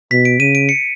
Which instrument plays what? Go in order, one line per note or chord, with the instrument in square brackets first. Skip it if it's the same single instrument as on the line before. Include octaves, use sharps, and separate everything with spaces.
[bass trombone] B2 [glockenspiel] B6
[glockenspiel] D7
[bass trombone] C#3 [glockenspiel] D#7
[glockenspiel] D7
C#7